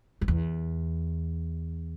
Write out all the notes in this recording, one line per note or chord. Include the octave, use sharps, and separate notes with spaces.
F#2
E2